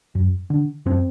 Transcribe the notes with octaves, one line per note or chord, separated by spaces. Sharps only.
F#2
D3
F#2 C4